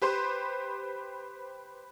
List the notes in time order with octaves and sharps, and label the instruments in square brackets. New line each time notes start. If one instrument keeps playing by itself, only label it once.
[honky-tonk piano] G4 B4 C5 C6